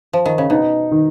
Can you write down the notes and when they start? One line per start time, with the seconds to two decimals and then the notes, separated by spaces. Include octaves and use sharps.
0.13 F3
0.26 D#3
0.38 C#3
0.50 B2 D#4
0.92 D#3